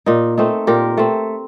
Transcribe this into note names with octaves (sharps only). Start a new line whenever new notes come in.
A#2 D#4
A3 C4 D#4
A#2 G4 A#4
A3 C4